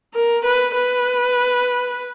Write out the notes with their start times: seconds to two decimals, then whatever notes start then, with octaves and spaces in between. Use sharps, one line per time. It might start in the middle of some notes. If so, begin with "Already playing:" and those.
0.15 A#4
0.44 B4
0.75 B4